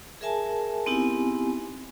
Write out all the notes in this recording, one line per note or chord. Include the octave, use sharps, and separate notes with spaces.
G#4 A#4 E5 G#5 A5
B3 C4 D#4 E4 G4 G#5